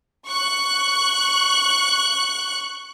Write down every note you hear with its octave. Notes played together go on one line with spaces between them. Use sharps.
C#6 F#6